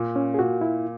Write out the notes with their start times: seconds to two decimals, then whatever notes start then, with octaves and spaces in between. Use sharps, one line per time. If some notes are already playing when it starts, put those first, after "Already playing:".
Already playing: A#2
0.16 C#4
0.34 G#4
0.39 A#2 F#4
0.61 E4